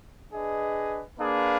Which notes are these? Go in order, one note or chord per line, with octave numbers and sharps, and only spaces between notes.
D4 G#4 B4 D#5
A#3 D4 G#4 B4 F5